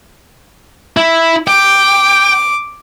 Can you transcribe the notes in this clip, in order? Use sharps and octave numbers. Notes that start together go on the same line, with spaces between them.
E4
G5 D6